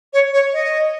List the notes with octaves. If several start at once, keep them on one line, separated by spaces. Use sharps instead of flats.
C#5
C#5
D#5